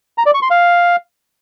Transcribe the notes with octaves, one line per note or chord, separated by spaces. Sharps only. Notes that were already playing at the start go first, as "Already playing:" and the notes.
A#5
D5
C#6
C6
F5